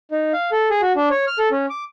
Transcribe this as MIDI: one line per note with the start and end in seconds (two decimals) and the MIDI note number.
0.11 0.33 63
0.33 0.50 77
0.52 0.69 69
0.70 0.81 68
0.82 0.93 66
0.96 1.09 62
1.10 1.26 73
1.27 1.38 89
1.39 1.49 69
1.51 1.66 61
1.70 1.84 86